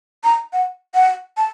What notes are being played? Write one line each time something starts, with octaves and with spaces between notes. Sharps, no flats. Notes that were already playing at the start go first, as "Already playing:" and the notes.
A#5
F#5
F#5
A5